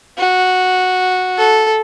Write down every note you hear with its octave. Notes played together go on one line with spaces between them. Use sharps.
F#4
A4